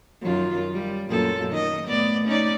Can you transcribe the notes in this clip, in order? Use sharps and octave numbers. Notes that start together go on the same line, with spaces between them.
F#2 D#3 F4
G3
F#2 A#2 A4
D#3 D#5
A2 B3 D5
C#4 D#4 D5